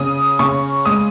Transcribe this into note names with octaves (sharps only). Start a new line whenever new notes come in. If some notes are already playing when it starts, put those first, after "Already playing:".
Already playing: C#3 D#6
C#3 C#6
G#3 D#6